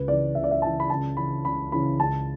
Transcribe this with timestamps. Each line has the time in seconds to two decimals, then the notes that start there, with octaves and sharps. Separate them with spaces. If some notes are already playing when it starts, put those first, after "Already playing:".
Already playing: C#2 B4
0.08 C#3 E3 D5
0.35 C#2 E5
0.44 D5
0.51 E5
0.62 C#3 E3 A5
0.80 B5
0.90 C#2 A5
1.16 C#3 E3 B5
1.45 C#2 B5
1.72 C#3 E3 B5
1.99 C#2 A5